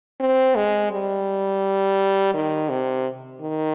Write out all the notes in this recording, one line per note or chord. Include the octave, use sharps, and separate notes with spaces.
C4
G#3
G3
D#3
C3
D#3